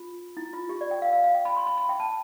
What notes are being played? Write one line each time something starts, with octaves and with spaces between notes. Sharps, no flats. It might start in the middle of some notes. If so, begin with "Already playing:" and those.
Already playing: F4
E4
F4
G4
D5
G5
F5
F5
F5
G5
B5
C6
B5
B5
G5
A5